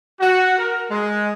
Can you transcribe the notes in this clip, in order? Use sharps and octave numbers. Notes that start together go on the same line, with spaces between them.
F#4
A#4
G#3